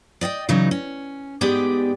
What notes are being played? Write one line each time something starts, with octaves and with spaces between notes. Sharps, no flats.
D5 D#5 F#5 G5
C#3 E3 F#3 D#4
C#4
G#2 B3 G4 G#4 D5 G5